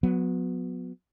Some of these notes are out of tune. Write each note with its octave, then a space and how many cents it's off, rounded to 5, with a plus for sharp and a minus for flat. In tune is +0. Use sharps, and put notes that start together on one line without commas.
F#3 -25 B3 +10